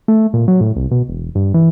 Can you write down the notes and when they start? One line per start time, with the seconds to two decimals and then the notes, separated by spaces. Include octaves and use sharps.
0.08 A3
0.34 A#2
0.48 F#3
0.61 A2
0.76 C2
0.91 B2
1.08 E1
1.35 G2
1.54 E3